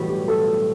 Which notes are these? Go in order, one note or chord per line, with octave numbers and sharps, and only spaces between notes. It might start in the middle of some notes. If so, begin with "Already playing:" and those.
Already playing: B1 A2 E3 G3 F#4
G4
A4